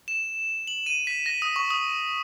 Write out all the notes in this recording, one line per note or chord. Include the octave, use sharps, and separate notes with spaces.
E7
F#7
D#7
B6
A#6
D#6
C#6
D#6